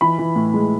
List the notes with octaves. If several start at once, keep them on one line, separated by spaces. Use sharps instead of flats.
E3 B5
E3
A2
G#3